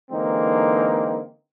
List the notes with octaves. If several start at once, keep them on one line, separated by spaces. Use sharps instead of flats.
D3 E3 G#3 A#3 C4 D#4